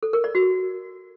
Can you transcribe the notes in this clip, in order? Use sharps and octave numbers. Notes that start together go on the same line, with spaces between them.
A4
A#4
D5
F#4